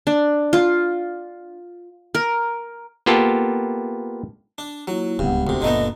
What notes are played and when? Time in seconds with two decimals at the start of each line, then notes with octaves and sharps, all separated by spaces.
0.07 D4
0.53 F4
2.15 A#4
3.06 A#3 B3 F4 G4 A4
4.58 D4
4.88 F#3 A#3 E4 F4
5.19 D1 C#2 G2 B3 F#5
5.47 D2 C3
5.62 F#1 A#2 D3 A3 B3 D#5 A#5